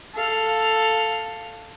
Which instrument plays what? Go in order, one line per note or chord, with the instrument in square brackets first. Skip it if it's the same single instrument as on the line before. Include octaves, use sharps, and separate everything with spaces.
[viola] A4 F5